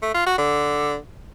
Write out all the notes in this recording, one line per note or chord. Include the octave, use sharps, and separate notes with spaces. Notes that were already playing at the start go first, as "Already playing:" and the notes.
A3
F4
F#4
D3